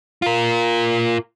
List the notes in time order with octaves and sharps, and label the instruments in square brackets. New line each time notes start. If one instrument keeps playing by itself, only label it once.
[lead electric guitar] F4 A#4